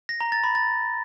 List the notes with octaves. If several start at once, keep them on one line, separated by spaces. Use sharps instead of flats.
A#6
A#5
A6
B5
A6